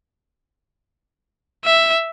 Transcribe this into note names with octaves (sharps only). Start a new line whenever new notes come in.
E5